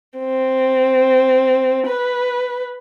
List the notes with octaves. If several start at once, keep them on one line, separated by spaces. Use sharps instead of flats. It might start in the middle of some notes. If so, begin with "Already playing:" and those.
C4
B4